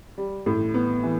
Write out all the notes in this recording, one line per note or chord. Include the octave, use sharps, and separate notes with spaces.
G3
A2
B3
E3